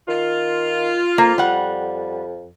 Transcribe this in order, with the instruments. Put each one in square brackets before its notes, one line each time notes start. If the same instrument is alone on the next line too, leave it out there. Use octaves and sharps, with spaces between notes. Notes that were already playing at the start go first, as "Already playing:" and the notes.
[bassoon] D#3 [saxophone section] F4
[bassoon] F2 [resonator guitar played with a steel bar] A#3
[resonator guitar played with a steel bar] G3 F#5